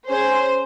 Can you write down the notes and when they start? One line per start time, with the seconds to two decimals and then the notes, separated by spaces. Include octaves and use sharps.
0.10 C#4 G#4 C5